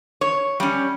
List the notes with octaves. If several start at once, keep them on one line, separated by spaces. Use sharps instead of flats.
C#5
G3 C#4